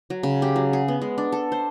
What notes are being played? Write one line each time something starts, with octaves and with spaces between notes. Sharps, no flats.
F#3
C#3
G4
F#3
G#4
B3
G#3
D4
A4
C5